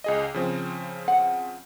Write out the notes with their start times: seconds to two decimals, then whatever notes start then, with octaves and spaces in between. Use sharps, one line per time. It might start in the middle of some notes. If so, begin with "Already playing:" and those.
0.04 C#2 G#4 D#5
0.34 C#3 F3 C4
1.08 F#5